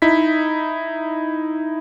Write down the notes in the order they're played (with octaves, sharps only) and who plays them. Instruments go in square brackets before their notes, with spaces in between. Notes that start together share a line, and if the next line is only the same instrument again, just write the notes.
[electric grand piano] D#4 E4 B6